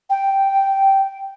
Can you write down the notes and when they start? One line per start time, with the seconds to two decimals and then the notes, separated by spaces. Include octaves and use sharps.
0.10 G5